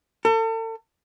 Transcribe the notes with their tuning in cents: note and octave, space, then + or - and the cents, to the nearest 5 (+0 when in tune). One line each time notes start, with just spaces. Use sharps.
A4 +40